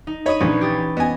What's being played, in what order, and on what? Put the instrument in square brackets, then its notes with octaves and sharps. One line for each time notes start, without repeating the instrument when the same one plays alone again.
[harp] D#4
[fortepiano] C#5 D#5 [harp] B5 D#6 D#7
[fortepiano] A#1 D4 [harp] E3 C#4
[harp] G4 D#6 A6
[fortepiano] B3 G#5 [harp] D#5